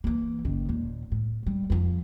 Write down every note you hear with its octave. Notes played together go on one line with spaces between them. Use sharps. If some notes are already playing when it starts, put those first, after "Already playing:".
E3 A#3
F#1 D#3
D#2 A#2
A2
G3
F2 F3